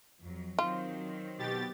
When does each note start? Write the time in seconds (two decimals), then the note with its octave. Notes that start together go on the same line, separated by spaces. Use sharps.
0.21 F2 F#3
0.59 D#3 F#3 C4 F4
1.38 B2 G4 A6